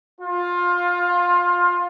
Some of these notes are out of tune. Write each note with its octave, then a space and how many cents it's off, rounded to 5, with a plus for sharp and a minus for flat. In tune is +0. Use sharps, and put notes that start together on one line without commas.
F4 +20